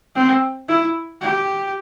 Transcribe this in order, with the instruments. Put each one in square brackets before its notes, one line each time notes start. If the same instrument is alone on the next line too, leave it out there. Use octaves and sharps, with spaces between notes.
[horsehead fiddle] C4
E4
G4